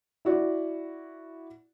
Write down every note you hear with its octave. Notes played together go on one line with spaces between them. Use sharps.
E4 F#4 D5